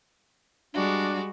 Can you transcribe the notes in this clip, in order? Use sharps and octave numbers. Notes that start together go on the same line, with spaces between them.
G3 G#3 D4 F#4